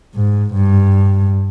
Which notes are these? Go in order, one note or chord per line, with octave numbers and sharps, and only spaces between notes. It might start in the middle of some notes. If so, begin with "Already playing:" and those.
G#2
G2